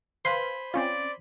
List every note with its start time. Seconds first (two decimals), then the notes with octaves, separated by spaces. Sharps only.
0.25 B4 C5 F5 G#5 B5 C6
0.74 C4 C#4 F4 D5